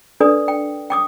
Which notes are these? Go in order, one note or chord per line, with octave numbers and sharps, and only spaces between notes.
D4 A4 B4 D5 D#6
G5
G5 D6 D#6